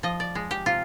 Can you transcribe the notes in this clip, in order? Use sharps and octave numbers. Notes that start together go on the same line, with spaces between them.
F3 D#5
D5
G#3
G4
C3 F4